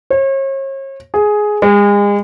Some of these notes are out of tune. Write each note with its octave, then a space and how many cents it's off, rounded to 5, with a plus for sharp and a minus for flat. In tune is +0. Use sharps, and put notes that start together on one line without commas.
C#5 -40
G#4 +10
G#3 -35